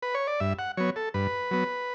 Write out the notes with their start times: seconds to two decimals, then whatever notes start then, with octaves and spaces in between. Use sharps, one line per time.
0.02 B4
0.15 C#5
0.27 D5
0.40 G2 E5
0.59 F#5
0.77 F#3 B3 C#5
0.96 A4
1.14 G2 B4
1.51 F#3 B3